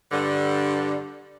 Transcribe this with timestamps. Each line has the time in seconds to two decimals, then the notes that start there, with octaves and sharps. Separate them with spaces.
0.11 G2 D3